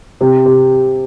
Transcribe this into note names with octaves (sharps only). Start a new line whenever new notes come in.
C3
C3